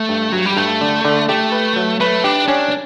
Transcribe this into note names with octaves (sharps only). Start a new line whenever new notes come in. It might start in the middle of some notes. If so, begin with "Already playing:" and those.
Already playing: A3
G2
G2 F#3
G3
G2 A3
D3
D3
A3 G4
B4
F#3
A3 B4
D4 G4
C#4 D4